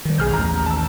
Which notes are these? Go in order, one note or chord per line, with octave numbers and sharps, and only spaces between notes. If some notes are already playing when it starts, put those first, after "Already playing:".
D#3 G3
B1 G#4 F6 G6
A1 D#2 A#5
A5 E6